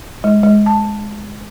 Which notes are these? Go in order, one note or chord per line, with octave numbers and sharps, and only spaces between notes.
G#3
G#3
A5